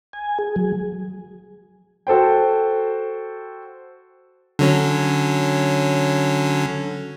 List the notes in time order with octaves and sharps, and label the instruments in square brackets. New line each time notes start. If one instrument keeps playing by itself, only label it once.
[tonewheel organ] G#5
G#4
F#3
[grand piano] F#4 A4 C5 G5
[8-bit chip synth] D3 F#3 C#4